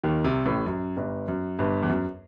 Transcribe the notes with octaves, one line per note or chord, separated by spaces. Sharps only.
D#2 D#3
C2 C3
A1 A2
F#2
G1 G2
F#2
G1 G2
E2
F#2